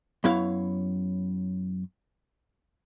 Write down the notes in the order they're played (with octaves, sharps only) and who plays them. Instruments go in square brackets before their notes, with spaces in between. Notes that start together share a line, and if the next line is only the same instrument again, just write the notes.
[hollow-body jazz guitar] F#2 F#3 B3 E4 C#5 F5